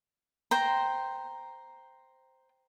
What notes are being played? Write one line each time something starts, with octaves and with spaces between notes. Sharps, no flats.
C5 G5 A#5